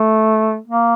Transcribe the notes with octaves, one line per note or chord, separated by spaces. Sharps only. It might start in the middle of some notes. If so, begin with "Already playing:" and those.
Already playing: A3
A#3